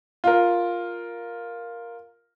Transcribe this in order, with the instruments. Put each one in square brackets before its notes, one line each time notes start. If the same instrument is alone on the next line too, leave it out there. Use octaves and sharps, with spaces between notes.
[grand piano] F4 A#4